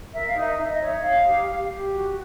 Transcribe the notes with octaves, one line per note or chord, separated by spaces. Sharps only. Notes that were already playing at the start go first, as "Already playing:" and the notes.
A#4 E5
F5
D#4 E5
D#4 E5
D#5
C#5 E5
D#4 F5
G4
G4
G4
F#4